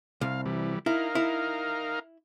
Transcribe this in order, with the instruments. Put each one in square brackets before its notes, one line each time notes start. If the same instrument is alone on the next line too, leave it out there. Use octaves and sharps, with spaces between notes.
[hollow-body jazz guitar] C2 [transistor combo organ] F5
[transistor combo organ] E3 G3
[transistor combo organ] D#4 A#4 F5 [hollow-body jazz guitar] E4
[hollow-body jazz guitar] E4